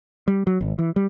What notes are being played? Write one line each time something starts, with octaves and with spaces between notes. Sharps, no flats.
G3
F#3
G#1
E3
G3